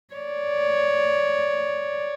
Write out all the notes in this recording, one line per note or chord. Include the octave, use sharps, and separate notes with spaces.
C#5 D5